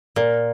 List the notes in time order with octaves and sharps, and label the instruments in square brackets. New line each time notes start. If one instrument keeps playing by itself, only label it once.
[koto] A#2 [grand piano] A#4